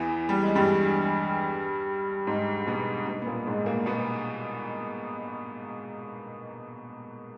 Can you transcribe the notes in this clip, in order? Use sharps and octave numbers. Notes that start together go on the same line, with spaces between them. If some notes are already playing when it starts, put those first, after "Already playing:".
Already playing: E2 E3
G3
G#3
G2 G3
G#2 G#3
B2 B3
B2 B3
B3
A#2 A#3
G#2 G#3
A#2 A#3
B2 B3